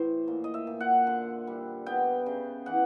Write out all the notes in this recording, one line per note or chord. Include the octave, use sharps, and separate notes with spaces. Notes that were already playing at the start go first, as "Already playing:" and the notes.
Already playing: A2 E3 C5
A#2
D#5
E5
A#2
F#5
D3
G3
B3 G5
C#3
E3 F#5